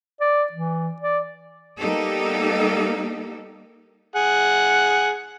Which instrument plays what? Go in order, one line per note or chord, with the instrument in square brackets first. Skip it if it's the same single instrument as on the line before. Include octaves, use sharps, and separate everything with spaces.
[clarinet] D5
E3
D5
[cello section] G3 A#3 B3 D#4 G4 A4
[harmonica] G#4 F#5